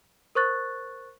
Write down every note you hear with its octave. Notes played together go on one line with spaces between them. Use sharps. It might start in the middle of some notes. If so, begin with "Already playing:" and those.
A#4 C5 C#6 F#6 A6